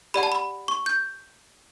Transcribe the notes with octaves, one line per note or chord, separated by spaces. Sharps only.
G4 D5 F#5 B5
A5
B5
C#6
G6